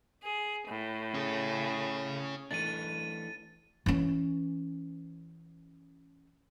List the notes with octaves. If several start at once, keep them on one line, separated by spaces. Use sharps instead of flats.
G#4
A2
C#4 G#4
E3 A3 D4 A6 D#7
E3 C#4